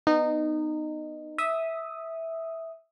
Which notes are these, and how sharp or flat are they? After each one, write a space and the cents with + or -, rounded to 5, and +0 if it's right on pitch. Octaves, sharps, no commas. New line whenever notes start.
B3 +0 D#4 -20
E5 -10 D#6 +0